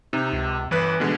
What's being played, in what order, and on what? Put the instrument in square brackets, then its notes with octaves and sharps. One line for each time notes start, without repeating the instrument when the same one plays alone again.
[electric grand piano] C3 [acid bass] D#4
[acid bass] C#2
[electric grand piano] G1 B4 F#6 [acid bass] E3
[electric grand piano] B2 D3 G#3